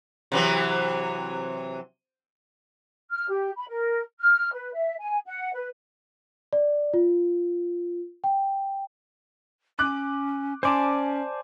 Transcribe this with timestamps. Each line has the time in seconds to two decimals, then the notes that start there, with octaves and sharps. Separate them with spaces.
0.32 C3 E3 F#3
3.12 F6
3.29 G4
3.56 B5
3.68 A#4
4.20 F6
4.53 B4
4.74 E5
4.99 G#5
5.26 F#5
5.53 B4
6.53 D5
6.94 F4
8.24 G5
9.79 C#4 D6 F#6
10.63 C#4 C5 D5 G#5 A5 C6 D6